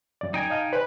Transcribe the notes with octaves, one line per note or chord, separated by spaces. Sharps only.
F#2 D5
D#4 G5 G#5
D#5 F5 A5
B4 C5 D5